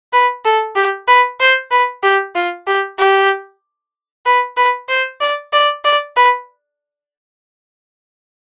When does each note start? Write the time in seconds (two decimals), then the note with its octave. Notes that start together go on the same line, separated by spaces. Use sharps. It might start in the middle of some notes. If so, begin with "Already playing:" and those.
0.13 B4
0.45 A4
0.75 G4
1.08 B4
1.40 C5
1.71 B4
2.03 G4
2.35 F4
2.67 G4
2.99 G4
4.26 B4
4.57 B4
4.89 C5
5.21 D5
5.53 D5
5.85 D5
6.17 B4